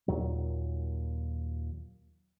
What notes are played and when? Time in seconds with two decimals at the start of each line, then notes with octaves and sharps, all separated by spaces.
0.08 D#2 A#2 F#3